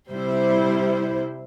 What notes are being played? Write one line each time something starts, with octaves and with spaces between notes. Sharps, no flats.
C3 G3 E4 C5